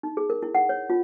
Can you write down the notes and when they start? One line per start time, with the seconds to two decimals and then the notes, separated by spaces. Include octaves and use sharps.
0.03 D#4
0.17 G#4
0.30 A#4
0.42 E4
0.55 F#5
0.69 C#5
0.90 F4